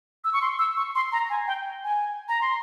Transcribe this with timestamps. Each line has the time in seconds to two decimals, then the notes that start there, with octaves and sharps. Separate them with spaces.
0.24 E6
0.33 C#6
0.42 C6
0.59 E6
0.77 C#6
0.95 C6
1.12 A#5
1.30 G#5
1.47 G5
1.84 G#5
2.28 A#5
2.41 C6